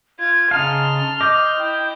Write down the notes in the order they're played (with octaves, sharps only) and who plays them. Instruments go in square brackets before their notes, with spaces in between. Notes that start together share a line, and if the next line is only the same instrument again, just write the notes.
[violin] F4 [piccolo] G#6
[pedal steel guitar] C#3 D#4 F5 [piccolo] A5 [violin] C6 F6
[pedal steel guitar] D#5 D6 [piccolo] G6
[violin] E4 [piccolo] G5